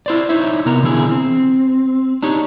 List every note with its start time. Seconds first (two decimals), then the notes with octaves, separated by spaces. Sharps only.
0.06 E4 C5 D5
0.29 D#4 E4 C5 C#5 E5
0.66 C3 B3 A#4
0.82 B2 D3 E3 A#3 E4 G#4
1.11 C4
2.23 D4 D#4 G4 C#5